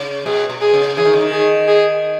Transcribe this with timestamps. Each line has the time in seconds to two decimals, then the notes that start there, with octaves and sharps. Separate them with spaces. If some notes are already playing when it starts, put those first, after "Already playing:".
Already playing: C#3
0.26 B2 G#4
0.50 B2
0.61 G#4
0.74 C#3
0.97 E3 G#4
1.05 D#3
1.13 C#3
1.21 D#3
1.32 G#4
1.68 G#4